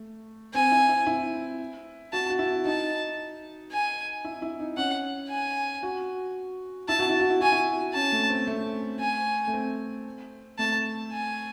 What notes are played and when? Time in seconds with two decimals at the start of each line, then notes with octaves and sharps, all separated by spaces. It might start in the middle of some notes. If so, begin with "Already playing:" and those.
Already playing: A3
0.54 C4 G#5
0.72 E4
0.89 E4
1.07 E4
2.13 F#4 A5
2.30 F#4
2.39 E4
2.65 D#4 A5
3.72 G#5
4.25 E4
4.42 E4
4.60 D#4
4.77 C#4 F#5
5.29 G#5
5.83 F#4
6.89 E4 A5
6.99 F#4
7.09 E4
7.20 F#4
7.30 E4
7.41 F#4 G#5
7.52 E4
7.94 C#4 A5
8.12 A3
8.30 C4
8.47 A3
9.00 G#5
9.48 A3
9.53 C4
10.58 A3 A5
11.12 G#5